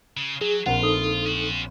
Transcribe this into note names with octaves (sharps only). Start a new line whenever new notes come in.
C#3
F#3 G#4
A#1 C4 F4 A#4 F#5
D#4 A4 D#6
C#4 F#4